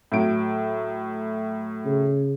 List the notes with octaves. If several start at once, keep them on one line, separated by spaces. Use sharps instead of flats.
A2 F#3 D7
C#3